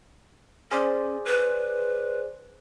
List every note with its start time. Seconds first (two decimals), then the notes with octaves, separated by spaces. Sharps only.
0.71 C#4 G#4 C5 D5
1.25 B4